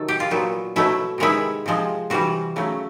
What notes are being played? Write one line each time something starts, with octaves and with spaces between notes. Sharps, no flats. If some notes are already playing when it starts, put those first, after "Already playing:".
Already playing: C3 D#3 F#3 A4
G4
F4
A#2 F#3 B3
B2 F#3 A3 E4
C3 D#3 G#3 B3 E4
C3 F3 G#3
C3 E3 G3 F#4
C#3 F#3 A3